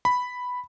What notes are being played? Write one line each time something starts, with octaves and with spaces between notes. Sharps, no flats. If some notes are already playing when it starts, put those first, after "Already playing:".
B5